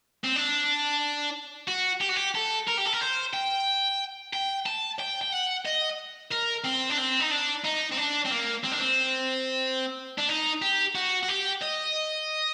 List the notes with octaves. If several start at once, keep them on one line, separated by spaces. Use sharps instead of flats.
C4
D4
F#4
G4
F#4
G4
A4
A#4
G4
A4
A#4
C5
G5
G5
A5
G5
G5
F#5
D#5
A#4
C4
D4
C4
D#4
D4
D#4
C4
D4
C4
A#3
C4
D4
C4
D4
D#4
G4
F#4
F#4
G4
D#5